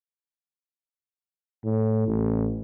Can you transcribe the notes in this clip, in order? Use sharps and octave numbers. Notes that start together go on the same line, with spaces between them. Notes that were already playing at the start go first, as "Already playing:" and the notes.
A2
A1